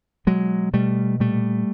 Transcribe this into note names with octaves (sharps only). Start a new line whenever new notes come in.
B2 F#3 G#3
B2 G3 A3
A#2 G3 A3